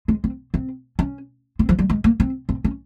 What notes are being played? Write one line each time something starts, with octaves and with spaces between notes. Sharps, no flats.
G#3
C4
C4
C#4
C4
F3
G3
G#3
A#3
C4
C4
C#4